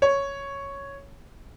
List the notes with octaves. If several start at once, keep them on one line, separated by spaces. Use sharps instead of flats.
C#5